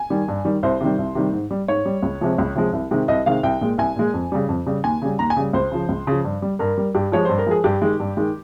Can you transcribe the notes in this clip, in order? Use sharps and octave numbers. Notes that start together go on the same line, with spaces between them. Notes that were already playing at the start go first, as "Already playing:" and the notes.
Already playing: G#5
D#3 G3
G2
D#3 G3
C2 C5
C3 D#3 G3
C2
C3 D#3 G3
G#2
G3
G#2 C#5
G3
C#2
C3 F3 G#3
C#2
C3 F3 G#3
C2
C3 D#3 G#3
C2 D#5
C3 D#3 G#3 F5
C2 G5
A#2 G#3
C2 G#5
A#2 G#3
F2
C#3 G3
F2
C#3 G3
D#2 G#5
C#3 G3
D#2 A#5
G#5
C#3 G3
C#2 C5
C#3 F3
C#2
C#3 F3
G2
G3
G2 A#4
G3
G2 G4
F3 G#3 C#5
G2 C5
A#4
F3 G#3 G#4
G2 G4
D#3 G#3
G2
D#3 G#3